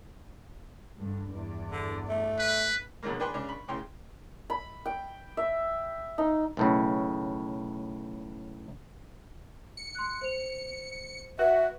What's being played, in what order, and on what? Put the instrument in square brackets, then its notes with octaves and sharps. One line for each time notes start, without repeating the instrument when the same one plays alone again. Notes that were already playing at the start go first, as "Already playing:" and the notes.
[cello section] G2 D3
E2 G2 D5
[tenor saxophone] D3
A3
[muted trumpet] B4
[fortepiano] F2 B2 D3 F#3 G#3 A#3
D4 G#4 B4 G5 B5 C6
C#3 G#3 D4
B5 C#6
A2 C#3 G5 C6
[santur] B5
G5
E5
D#4
[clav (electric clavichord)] B1 A2 C#3
[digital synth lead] C#7
[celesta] C6 F#6
C5 F7
[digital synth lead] F#4 [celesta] B4 [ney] E5